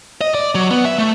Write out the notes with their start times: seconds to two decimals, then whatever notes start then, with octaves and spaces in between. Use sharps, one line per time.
0.21 D#5
0.35 D5
0.55 F#3
0.71 B3
0.85 E5
0.98 A3